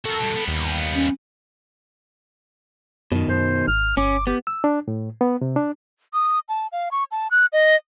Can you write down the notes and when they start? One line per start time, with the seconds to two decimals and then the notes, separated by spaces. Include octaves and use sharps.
0.05 F#4 A4 A#4
0.21 G2 B2
0.36 G3 B3
0.48 D#2
0.94 C#4
3.12 F#2 B2 D#3
3.29 F#2 C5
3.68 G#1 F6
3.97 G1 C#4 D6
4.27 B3 G4
4.47 E6
4.64 D4
4.88 A2
5.21 B3
5.41 C3
5.56 D4
6.14 D#6
6.49 A5
6.72 F5
6.92 C#6
7.11 A5
7.31 F#6
7.53 D#5